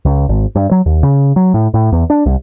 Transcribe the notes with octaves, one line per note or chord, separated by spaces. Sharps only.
C#2
G#1
G2
F#3
D#2
C#3
F#3
A2
A2
E2
D4
C2